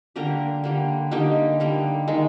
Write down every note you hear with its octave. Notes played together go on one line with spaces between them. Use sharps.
D3 G3 A#3 G4 A#4
D3 G3 A#3
D3 G3 A#3 D#4 G4
D3 G3 A#3
D#3 G#3